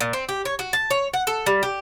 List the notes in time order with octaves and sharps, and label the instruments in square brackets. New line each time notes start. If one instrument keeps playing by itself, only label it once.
[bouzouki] A#2
C4
G4
C#5
F#4
A5
C#5
F#5
A4
G3
G4